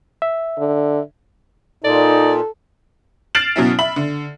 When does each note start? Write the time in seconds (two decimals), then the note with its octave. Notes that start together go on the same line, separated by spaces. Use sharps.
0.22 E5
0.59 D3
1.84 A#2 D#4 A4 D5
3.35 F6 A6 C7 D7 E7 F#7
3.56 B2 F#3 C#4 E4
3.79 E5 B5 F#7
3.96 D3